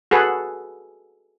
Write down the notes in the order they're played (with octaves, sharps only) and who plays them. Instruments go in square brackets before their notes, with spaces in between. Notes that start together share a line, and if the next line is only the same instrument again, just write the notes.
[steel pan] F#4 G#4 A4 B4